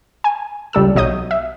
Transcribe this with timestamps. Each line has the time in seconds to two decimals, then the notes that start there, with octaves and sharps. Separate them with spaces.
0.24 G#5
0.73 C#2 G3 A4 E6
0.95 B1 F#3 D#5 D#6 G6
1.31 E5